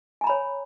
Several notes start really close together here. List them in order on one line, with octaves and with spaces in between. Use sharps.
G#5 A#5 B5 C#5